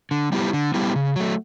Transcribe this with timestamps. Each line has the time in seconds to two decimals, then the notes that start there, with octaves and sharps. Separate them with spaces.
0.11 D3
0.32 G3 B3 E4 G4
0.53 D3
0.74 G3 B3 E4 G4
0.96 C#3
1.16 F#3 A3